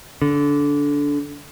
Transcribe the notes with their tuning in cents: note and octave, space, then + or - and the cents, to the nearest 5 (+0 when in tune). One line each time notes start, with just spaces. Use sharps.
D3 -20